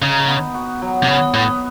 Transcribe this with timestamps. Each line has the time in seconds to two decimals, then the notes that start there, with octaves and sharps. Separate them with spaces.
0.02 C#3 D#4
0.28 B3
0.54 F#4
0.82 F#3
1.03 C3
1.08 C#3 B3
1.34 A2 B3